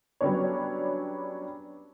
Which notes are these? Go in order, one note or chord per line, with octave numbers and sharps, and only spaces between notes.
F#3 G3 B3 C#4 D4 C#5